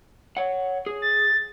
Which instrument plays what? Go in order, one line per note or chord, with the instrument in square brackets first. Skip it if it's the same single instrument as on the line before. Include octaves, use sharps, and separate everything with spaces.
[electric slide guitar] C#5 F#5
G#4
[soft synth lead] A6